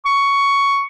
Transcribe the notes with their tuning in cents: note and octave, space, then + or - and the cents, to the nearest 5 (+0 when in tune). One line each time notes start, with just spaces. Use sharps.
C#6 +10